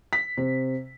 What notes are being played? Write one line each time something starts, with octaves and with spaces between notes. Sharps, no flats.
B6
C3